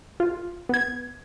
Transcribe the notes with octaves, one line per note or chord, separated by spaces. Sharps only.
F4
B3 G#6